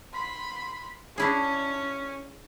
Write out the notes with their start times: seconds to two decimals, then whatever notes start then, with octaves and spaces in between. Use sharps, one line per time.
0.14 B5 C6
1.18 C#4 D4 E4 G#4